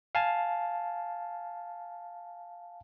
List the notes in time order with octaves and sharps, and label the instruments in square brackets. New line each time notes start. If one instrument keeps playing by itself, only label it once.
[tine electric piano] F5 G#5 A5